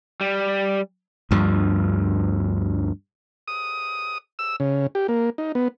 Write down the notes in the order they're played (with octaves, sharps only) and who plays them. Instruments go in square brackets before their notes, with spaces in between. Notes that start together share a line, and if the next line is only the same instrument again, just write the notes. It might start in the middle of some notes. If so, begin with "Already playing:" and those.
[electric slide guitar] G3
[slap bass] D2 G2 F3
[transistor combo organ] D#6
E6
C#3
G4
A#3
D#4
B3